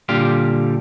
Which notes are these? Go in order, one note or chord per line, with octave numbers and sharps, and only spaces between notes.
A#2 D3 G3 G4 F5 C6